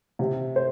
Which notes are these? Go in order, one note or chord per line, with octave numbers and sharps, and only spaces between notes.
C3
C5